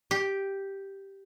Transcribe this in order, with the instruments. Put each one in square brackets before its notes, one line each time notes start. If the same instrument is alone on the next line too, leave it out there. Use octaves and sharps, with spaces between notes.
[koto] G4